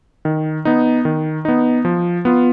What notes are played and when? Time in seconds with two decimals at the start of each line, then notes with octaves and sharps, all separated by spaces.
0.25 D#3
0.65 B3 D#4
1.05 D#3
1.45 B3 D#4
1.85 F3
2.25 B3 F4